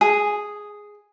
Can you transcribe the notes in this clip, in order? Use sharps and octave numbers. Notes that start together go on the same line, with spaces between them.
G#4